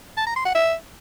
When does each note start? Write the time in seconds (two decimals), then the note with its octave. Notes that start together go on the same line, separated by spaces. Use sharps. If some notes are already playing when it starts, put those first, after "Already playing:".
0.17 A5
0.26 A#5
0.36 C6
0.45 F#5
0.55 E5